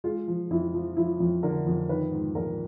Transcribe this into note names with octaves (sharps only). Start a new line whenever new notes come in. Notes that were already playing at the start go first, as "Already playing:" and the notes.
G#3 F4
F3
F2 E4
F3
F3 E4
F2
D3 A#4
F2
D#3 B4
G#2
A#1 A#4